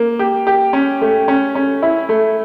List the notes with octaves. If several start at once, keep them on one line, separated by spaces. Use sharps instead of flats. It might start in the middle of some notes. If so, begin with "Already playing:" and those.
Already playing: A#3
G4
G4
C#4
A3
C#4
C#4
E4
A3